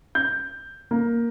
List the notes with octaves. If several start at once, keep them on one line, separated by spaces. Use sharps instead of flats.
G6
A#3